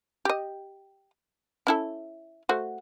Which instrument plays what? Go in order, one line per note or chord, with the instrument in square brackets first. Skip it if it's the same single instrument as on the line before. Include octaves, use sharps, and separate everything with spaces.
[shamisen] G4 D#5
C#4 E4 A4
A3 F#4 C5